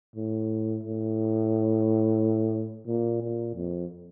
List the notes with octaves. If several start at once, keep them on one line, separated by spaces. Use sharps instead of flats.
A2
A2
A#2
A#2
F2